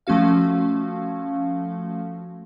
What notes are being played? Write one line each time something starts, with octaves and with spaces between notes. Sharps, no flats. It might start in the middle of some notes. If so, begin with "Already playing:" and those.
F3 A3 C#4 F#4 F5